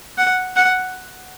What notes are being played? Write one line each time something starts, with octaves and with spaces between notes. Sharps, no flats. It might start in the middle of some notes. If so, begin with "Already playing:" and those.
F#5
F#5